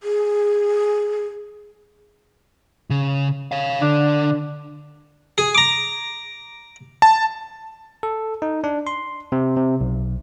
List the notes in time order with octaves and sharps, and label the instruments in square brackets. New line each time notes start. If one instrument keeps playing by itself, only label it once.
[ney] G#4
[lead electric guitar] C#3
C#5 F5
[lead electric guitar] D3 [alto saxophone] D4
[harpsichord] G#4
A#5 D6
[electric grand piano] A5
[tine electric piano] A4
D#4
D4
C6
C3
C3
B1